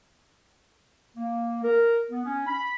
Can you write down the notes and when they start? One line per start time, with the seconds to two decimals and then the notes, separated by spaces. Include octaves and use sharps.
1.16 A#3
1.63 A#4
2.10 B3
2.25 C#4
2.47 B5